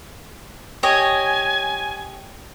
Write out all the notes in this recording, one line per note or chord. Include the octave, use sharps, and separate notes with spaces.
G4 C#5 D#5 G#5